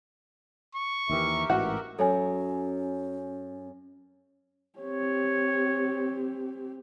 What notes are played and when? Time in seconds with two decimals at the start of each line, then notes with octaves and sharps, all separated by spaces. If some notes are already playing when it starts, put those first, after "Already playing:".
0.75 C#6
1.10 D#2 E3 G4 A#4 E5
1.50 A1 G#2 E3 F#4
1.99 F#2 C#4 A4 C#5 G#5
4.79 C4 G4 C#5